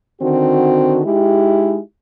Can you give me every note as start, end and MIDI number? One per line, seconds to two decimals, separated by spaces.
0.21 1.01 50
0.21 1.01 51
0.21 1.01 60
0.21 1.01 66
1.05 1.79 56
1.05 1.79 63
1.05 1.79 64
1.05 1.79 67